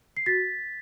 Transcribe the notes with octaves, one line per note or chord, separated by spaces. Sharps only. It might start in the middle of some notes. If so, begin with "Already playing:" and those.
C7
F#4 A6 B6